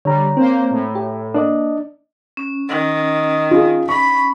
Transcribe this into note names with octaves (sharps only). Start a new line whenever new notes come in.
D3 G3 C#5 A#5
A#3 C4 C5
A2
G4
A#3 D4 D5 D#5
C#4
D#3
F4 G#4
B5 C#6